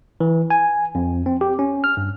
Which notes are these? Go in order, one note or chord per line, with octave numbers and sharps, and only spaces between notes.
E3
G#5
F2
C4
G4
C#4
F6
G2